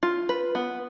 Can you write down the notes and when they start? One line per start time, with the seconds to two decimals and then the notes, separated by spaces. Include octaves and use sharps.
0.03 F4
0.29 B4
0.55 B3